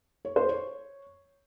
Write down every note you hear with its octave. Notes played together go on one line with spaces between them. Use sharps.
C#5
C5
C#5